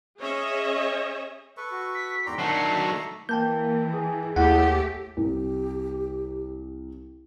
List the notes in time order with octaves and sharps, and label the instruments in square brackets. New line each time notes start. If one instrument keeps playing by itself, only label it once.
[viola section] C#4 G#4 C#5 D#5 E5
[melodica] A4 B4 C#6
[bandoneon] F#4
[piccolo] B6
[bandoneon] E2 G#2 G5 [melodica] D5 A#5 C6
[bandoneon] D#3 D4 [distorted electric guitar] F#3 A3 [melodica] E5 A#5 C#6 [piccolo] C7
[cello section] E3 [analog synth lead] A#3 [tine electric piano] G5 A5 G6
[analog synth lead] G#4
[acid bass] D#2 [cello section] A3 G4 [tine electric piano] E4 F#5
[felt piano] C2 [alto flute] G4